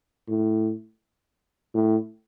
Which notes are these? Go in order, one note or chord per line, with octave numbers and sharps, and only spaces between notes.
A2
A2